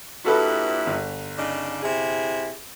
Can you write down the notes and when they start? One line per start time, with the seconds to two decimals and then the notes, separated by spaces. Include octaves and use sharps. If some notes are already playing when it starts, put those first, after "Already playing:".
0.25 G2 A#2 E4 F#4 A4 B4
0.86 G1
1.38 C#3 D4 D#4
1.82 C3 E4 G#4